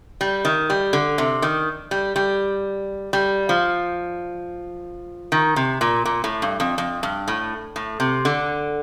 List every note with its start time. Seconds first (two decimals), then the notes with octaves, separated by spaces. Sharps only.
0.21 G3
0.45 D#3
0.70 G3
0.93 D3
1.18 C3
1.42 D#3
1.91 G3
2.16 G3
3.13 G3
3.49 F3
5.32 D#3
5.56 C3
5.81 A#2
6.05 A#2
6.24 A2
6.42 G2
6.60 F2
6.78 F2
7.03 G2
7.28 A2
7.76 A2
8.00 C3
8.25 D3